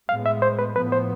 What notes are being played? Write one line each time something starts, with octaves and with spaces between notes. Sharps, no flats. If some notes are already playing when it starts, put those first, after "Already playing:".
A2 G#3 B3 F5
E5
C5
B4
A2 F3 B3 B4
C5